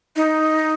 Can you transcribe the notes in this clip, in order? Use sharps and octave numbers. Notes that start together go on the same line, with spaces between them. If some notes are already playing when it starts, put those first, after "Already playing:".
D#4